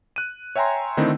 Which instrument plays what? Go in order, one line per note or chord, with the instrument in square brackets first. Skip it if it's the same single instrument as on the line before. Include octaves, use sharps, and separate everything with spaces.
[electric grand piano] F#6 D#7
C#5 E5 G5 G#5 A#5 C6
D3 D#3 A3 C4 D#4 E4